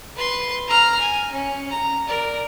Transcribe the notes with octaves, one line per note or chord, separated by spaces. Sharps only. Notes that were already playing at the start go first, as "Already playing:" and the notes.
B4 C6
A#5 F6
G#5
C#4
A#5
A#4 D5